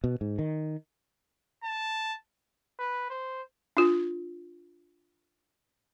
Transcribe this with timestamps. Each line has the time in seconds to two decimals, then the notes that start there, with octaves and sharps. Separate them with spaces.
0.04 B2
0.21 G#2
0.39 D#3
1.64 A5
2.79 B4
3.10 C5
3.77 D4 F4